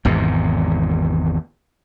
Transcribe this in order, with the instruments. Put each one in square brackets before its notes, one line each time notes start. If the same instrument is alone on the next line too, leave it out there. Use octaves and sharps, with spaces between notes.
[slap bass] G#1 E2 G#2 C3